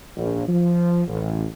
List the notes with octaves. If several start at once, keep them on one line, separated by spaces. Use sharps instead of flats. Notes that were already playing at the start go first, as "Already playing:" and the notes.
A#1
F3
A1